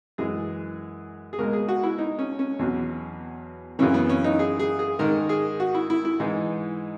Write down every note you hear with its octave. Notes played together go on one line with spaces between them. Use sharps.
F#2 E3 G#3 G#4
G#4
C#2 B2 G#3 A#4
G#4
F#4
E4
D#4
C#4
C#4
E2 B2 F#3
F#2 C#3 E3 C#4
B3
C#4
D#4
G#4
G#4
G#4
G#2 D#3 G#3 A#4
G#4
F#4
E4
E4
E4
G#2 E3 G#3 D#4